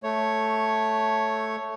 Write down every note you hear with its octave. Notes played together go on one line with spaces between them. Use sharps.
A3 C#5